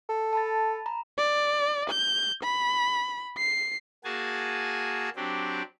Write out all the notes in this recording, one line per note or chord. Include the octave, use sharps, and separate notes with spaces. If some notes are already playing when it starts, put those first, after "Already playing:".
A4
A5 B5 A6
A#5 B5
D5
G6
B5
C7
A#3 F#4 G#4 G#5 A5
F#3 C4 D4 G4